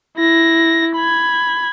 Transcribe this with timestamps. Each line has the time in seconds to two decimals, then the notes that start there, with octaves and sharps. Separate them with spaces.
0.17 E4 A#6
0.96 B5 G#6